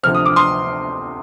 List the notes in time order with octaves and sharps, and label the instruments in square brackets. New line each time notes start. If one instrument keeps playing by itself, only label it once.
[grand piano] D2 C3 F3 C4 F6
D#6
D6
C6 D#6